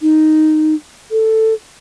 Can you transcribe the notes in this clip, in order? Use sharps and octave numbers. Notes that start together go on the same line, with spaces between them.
D#4
A4